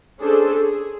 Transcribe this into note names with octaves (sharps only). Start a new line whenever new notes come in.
C#4 D4 G#4 A4 C5
G#4